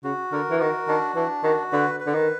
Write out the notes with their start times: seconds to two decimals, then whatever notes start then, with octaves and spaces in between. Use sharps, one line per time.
0.04 C#3 F#4
0.32 D3 A#4
0.51 E3
0.60 D#3 F#4
0.88 D#3 D4
1.15 E3 D4
1.44 D#3 F#4
1.72 D3 B4
2.00 B4
2.06 D3
2.14 D#3